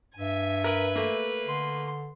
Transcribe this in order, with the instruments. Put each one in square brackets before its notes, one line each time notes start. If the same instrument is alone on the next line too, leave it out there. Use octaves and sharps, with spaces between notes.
[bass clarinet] G2 [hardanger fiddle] E5 G#5
[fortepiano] A#4 [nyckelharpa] B4
[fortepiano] A3 A#3
[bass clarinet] D3 [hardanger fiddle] C6